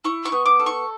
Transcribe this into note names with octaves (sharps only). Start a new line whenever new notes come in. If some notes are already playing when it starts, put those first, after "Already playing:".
E4 C#6
C#6
B3
D6
A4
C#6